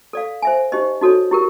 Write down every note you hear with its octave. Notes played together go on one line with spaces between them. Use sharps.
A4 D5 F5
C5 E5 G#5
D#4 G4 C5 D#5
D#4 F#4 A4 C#5
E4 G4 A#4